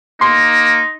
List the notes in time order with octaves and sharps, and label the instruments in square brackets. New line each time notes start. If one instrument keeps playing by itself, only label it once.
[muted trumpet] A#3 [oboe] D#4 [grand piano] C6